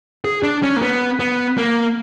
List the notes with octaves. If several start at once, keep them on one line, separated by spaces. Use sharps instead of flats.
G#4
D4
C#4
A#3
B3
B3
A#3